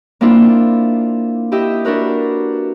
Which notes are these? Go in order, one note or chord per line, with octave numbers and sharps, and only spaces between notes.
A#3 C4 D4 E4 F4
E4 G4 D#5 E5
D4 F#4 A#4 B4